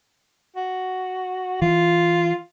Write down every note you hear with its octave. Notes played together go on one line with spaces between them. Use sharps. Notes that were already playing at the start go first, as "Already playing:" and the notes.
F#4
E3 F4